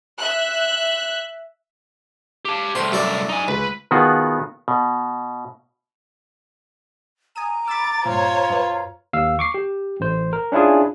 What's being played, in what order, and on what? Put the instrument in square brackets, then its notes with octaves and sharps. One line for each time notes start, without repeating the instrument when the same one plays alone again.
[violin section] E5 F#6
[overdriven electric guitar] G4 A5
[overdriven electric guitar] C2 A2 [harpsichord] C5
[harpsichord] F#2 E4 D5
[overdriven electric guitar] D#4 G#5
[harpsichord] C#2 [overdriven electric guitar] B4
[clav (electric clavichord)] B2 D#3 B3 F4 F#4 G#4
B2
[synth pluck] G#5 D#6 D#7 [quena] A#5
[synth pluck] B5 E6 [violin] D6 A6
[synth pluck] G2 A#2 [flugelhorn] F4 [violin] C5 C#5
[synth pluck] F#2 B4
[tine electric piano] D#2 F5 E6
C#6 D6 C7
G4
A1 C5
A#4
C#4 D4 E4 F4 G#4